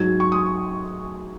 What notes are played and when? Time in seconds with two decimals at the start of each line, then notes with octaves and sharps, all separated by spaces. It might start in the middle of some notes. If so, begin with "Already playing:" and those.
Already playing: G#2 F#3 G#6
0.20 C#6
0.32 D#6